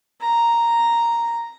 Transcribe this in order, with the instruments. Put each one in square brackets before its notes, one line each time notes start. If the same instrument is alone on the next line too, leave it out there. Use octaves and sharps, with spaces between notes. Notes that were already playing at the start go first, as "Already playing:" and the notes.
[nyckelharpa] A#5